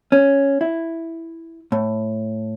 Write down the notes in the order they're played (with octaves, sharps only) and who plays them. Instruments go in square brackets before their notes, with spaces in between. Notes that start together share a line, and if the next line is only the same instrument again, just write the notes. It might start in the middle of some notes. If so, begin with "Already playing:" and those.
[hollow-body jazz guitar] C#4
E4
A2